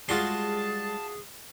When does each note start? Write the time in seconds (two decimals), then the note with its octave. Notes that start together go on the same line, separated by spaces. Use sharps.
0.09 G3 G#3 F4 F#4 G#4 A5 C6